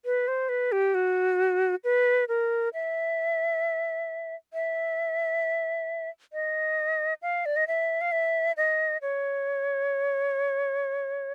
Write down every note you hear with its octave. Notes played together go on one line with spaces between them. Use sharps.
B4
C5
B4
G4
F#4
B4
A#4
E5
E5
D#5
F5
D5
D#5
E5
F5
E5
D#5
C#5